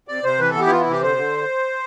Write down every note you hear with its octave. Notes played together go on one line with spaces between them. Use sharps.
C3 D5
C3 C5
E3 B4
A4
B3
G4
E4
E3 F4
E4
C3
G4
D3 C5
D3